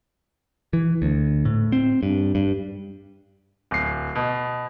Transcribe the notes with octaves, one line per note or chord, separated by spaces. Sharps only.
E3
D2
A2
C4
G2
G2
D1 C7
B2